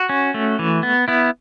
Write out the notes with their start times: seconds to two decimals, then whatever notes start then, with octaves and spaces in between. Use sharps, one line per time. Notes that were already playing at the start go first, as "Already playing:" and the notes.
Already playing: F#4
0.09 C#4
0.34 A3
0.59 E3
0.83 B3
1.08 B3 E4